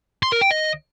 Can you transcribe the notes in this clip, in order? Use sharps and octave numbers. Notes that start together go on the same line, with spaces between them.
C6
A#4
G5
D#5